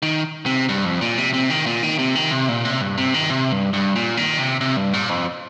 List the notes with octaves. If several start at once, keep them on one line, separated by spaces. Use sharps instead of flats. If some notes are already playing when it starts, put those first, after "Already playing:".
D#3
C3
G2
F2
A#2
C3
C3
D#3
A#2
D#3
C3
D#3
C3
A#2
C3
G2
C3
D#3
C3
G2
G2
A#2
D#3
C3
C3
G2
A#2
F2